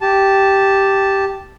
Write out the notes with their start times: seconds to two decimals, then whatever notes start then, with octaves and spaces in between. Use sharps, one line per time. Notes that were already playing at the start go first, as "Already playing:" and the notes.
0.01 G4 A5